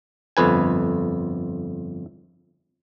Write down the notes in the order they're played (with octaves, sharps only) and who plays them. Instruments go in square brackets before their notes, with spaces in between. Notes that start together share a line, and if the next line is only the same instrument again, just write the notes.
[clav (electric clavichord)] G1 F2 B4 G#5